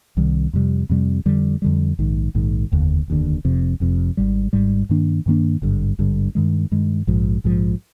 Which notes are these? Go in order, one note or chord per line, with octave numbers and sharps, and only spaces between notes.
C2 C3 D#3 G3
F2 C3 G3
F2 C3 G3
F2 D3 G3
F2 D3 G3
A#1 G#2 D#3
A#1 G#2 D#3
F1 D#2 D3
F1 D#2 D3
F1 F2 C3
F1 F2 C3
G#1 G#2 G3
G#1 G#2 G3
G2 D#3 A#3 D4
G2 D#3 A#3 D4
G#1 G2 D3
G#1 G2 D3
G2 D#3 G#3
G2 D#3 G#3
A#1 G#2 F3
A#1 G#2 F3